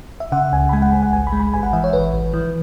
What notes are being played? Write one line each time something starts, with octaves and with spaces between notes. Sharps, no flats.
E5
C#3 F#5
C#2 G#5
B5
G#3 G#5
F#5
C#2 G#5
F#5
G#1 G#5
B5
G#3
B5
G#1 G#5
F#5
E3 E5
C#5
G#1 B4
G#1
E3